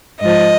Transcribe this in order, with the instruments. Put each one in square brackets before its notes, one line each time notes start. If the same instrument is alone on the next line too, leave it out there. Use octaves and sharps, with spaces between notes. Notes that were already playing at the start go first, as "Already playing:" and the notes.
[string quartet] G#2 F3 D#5